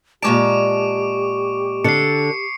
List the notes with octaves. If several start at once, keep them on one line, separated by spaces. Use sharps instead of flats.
A#2 G#3 G4 A5 C#6 D6 D7
D3 A4 C7 C#7